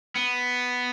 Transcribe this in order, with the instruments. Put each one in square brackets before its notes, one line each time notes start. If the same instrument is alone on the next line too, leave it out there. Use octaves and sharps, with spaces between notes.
[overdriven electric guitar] B3